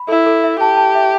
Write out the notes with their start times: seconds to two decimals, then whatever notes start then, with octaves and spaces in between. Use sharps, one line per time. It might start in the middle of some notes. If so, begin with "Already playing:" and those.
Already playing: B5
0.08 E4 A4
0.26 A4
0.44 E5
0.60 G4 A5
0.77 A5
0.95 E5